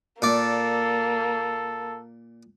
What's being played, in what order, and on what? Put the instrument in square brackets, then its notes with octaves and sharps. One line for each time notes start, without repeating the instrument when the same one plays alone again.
[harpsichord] A#2 D5 [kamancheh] A#3 [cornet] A4